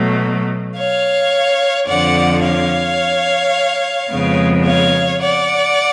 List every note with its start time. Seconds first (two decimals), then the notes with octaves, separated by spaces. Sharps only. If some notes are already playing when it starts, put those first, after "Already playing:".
Already playing: B2 F#3 A3
0.77 C#5 F5
1.88 F2 D3 F3 D5 F#5
2.44 C#5 F5
4.11 F2 C#3 G#3 B3
4.65 C#5 F5
5.21 D5 F#5